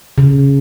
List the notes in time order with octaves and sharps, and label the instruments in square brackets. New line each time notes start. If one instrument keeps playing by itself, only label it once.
[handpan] C#3